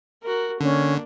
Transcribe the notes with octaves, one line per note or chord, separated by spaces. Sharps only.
F#4 A#4
D3 A#3 C#4 D4